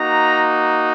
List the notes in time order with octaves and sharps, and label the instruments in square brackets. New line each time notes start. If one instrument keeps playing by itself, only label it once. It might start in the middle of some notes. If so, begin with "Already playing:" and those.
Already playing: [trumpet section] A#3 D#4 F#4 A#5